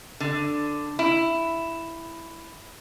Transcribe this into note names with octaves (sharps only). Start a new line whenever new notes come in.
D3
E4